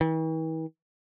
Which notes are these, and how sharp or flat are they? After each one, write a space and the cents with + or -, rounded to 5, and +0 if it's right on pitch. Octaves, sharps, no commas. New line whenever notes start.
E3 -45